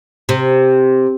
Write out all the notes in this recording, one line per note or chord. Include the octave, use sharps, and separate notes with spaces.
C3